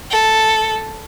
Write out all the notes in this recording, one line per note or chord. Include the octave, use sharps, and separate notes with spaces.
A4